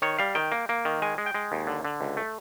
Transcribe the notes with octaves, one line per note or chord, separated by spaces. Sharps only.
D#3 C#5
G3 F5
D#3 G5
A#3
A#3
D#3
G#3 G#5
G#3
G5
G#3
D#2
D3
D3
C#2
A3